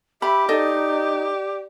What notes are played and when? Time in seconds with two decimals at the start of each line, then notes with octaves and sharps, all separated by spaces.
0.22 G4 E5 B5
0.49 D#4 A4 D5 D#5